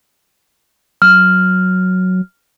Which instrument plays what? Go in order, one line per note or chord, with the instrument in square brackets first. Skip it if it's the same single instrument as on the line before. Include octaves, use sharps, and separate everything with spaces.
[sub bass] F#3 [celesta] F6